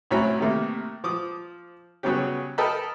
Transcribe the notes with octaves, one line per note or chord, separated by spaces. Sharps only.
C2 A2 F#3 C#4 A#5 B5
C3 D#3 A3 A#3
F3 D6 D#6
C#3 F#3 G3 B3 C#4 G4
A4 A#4 D#5 G5 A5 B5